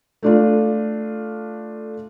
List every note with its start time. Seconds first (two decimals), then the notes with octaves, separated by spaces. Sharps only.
0.23 A3 D4 F4